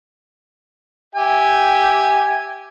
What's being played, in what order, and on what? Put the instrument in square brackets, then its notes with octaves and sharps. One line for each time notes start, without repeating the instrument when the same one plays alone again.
[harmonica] G4 E5 G#5